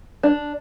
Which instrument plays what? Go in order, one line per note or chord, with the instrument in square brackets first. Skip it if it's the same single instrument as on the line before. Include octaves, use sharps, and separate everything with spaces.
[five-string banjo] D4